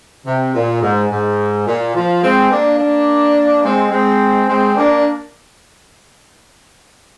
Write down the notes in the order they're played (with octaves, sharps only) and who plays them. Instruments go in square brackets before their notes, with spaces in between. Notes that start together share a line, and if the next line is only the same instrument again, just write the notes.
[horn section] C3
A#2
G#2
G#2
A#2
F3
G#3 C4
A#3 D4
A#3 D4
G#3 C4
G#3 C4
G#3 C4
A#3 D4